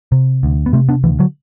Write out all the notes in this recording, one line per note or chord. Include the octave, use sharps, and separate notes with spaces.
C3
D2
B3
C3 A3 C4
B3 D4
D2 E3
D3 F#3